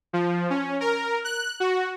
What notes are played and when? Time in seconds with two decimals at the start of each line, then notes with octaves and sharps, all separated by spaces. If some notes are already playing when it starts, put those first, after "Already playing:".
0.13 F3
0.50 C#4
0.80 A#4
1.24 F#6
1.60 F#4